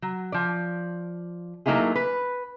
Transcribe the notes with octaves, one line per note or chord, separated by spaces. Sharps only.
F#3
F3 D5
F#3 A3 A#3 D#4 E4 G#4
B4